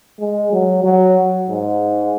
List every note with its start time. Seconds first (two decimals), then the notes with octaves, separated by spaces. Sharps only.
0.20 G#3
0.53 F#3
0.84 F#3
1.48 G#2